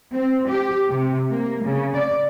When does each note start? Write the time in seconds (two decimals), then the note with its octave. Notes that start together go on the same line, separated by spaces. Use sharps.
0.14 C4
0.49 G4
0.91 C3
1.31 A#3
1.64 C#3
1.96 D5